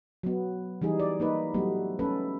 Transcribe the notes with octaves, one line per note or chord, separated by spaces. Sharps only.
F#3 B3
E3 G3 D#4 G#4
D5
A#3 D#4 B4
F#3 G3 A3 B3
A3 C#4 A4 B4